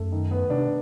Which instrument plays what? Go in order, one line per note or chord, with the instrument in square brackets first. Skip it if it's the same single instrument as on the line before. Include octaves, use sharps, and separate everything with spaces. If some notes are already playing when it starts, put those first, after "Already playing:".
Already playing: [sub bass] F#2 [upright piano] A3
[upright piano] D#3
B3
[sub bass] C3 [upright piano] D4